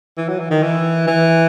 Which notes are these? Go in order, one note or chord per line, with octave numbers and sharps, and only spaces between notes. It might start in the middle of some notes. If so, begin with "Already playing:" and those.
E3
F#3
E3
D#3
E3
E3